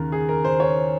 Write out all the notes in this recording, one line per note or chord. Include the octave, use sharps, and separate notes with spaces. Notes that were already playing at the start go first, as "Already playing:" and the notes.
Already playing: D#2 C#3 A#4
G#4
A#4
C5
C#5